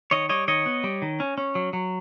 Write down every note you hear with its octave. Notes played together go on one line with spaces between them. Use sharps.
D#3 C#5 D#5
G3 C#5 D#5
D#3 C#5 D#5
B3
G3
D#3
C#4
C#4
F#3
F#3